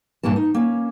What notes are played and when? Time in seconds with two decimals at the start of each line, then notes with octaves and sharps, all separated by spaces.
0.23 G2 A#2 E3 A#3 A5
0.36 D#4
0.54 A#3 C#4